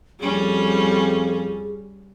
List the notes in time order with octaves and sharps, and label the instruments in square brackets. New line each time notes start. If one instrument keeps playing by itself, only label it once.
[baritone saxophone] F2 [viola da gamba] G3 C#4 [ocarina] G#4